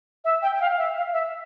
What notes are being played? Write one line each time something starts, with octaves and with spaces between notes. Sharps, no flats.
E5
G5
G5
F5
E5
F5
E5